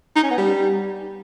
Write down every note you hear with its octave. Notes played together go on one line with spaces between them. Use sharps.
D#4
C#4
B3
G3